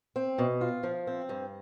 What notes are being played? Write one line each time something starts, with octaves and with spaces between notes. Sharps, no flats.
C4
B2
F4
F3
C4
G2